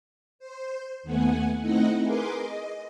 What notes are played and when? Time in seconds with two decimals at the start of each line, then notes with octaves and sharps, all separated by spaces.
0.39 C5
1.03 D#2 A3 B3 F#5 G#5
1.60 A3 C4 D#4 E4 D#5 F#5
2.02 G#4 A#4 B4 G#5 C6 D6
2.38 D#5